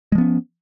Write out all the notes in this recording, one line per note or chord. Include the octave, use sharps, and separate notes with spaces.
F3 G#3 B3 C#4